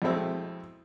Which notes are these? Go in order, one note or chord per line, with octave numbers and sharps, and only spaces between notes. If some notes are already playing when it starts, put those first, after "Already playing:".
F2 B2 G#3 A3 C4 E4